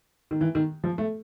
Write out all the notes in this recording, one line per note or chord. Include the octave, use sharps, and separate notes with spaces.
D#3
E3
D#3
F3
A3